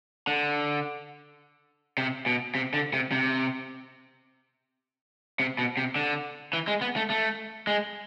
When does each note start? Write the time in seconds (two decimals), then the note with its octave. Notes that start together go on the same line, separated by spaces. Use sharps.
0.27 D3
1.98 C3
2.26 B2
2.55 C3
2.74 D3
2.93 C3
3.12 C3
5.40 C3
5.58 B2
5.77 C3
5.96 D3
6.53 E3
6.67 G#3
6.81 B3
6.96 A3
7.10 A3
7.67 G#3